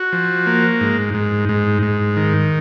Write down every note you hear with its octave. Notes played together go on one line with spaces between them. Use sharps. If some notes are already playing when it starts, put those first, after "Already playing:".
Already playing: F#4
F3
A#3
G#2
G#2
G#2
G#2
D#3